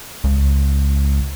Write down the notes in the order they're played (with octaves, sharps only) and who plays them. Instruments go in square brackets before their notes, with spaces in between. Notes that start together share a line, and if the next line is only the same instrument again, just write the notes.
[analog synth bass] C#2